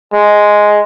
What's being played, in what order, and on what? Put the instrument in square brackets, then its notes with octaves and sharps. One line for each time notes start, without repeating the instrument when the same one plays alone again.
[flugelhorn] G#3